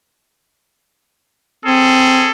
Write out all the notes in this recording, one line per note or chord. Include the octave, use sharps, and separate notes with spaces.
C4 C#4 G#4 A4